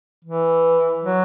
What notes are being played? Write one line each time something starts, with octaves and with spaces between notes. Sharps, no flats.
E3
F#3